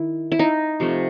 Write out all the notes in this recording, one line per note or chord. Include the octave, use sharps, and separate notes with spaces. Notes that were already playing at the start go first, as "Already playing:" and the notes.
Already playing: D#3 E4
E4
D#4
C3 F3 A3